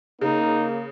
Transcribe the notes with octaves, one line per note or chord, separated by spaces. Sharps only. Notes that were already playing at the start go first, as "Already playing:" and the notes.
C#3 A#3 D#4